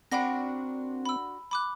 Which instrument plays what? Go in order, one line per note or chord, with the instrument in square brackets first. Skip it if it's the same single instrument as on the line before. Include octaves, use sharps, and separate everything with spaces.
[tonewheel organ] C4 [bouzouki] D4 F#4 A#4 [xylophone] G5 B5 A#6
[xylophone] B5 E6
B5 D6 F#6